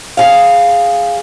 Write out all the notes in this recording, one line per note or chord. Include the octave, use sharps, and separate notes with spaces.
G#4 F5